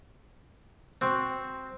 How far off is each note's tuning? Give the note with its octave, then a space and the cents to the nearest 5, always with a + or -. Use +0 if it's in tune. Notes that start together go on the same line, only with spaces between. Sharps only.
C4 +0 F#4 +0